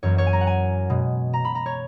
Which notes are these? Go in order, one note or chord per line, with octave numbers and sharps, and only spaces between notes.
F#2 E3 A#3 C#5
C#5
G#5
A#5
F#5
G#5
B2 G#3
A#5
B5
A#5
C#5